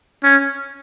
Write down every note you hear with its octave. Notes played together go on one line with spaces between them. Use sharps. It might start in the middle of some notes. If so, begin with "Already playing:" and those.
C#4